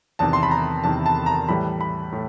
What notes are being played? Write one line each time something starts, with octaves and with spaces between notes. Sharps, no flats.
E2 C3 D#3 A5
C6
B5
A#5
E2 C3 D#3 A5
A5
A#5
A2 E3 G3 B5
B5
A2